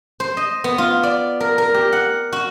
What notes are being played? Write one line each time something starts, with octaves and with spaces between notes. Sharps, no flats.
C5
D#5
B3
F4
D5
A#4
A#4
G4
F#5
F#4